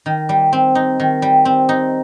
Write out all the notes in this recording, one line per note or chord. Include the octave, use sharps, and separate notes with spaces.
D#3
G3
C4
D#4
D#3
G3
C4
D#4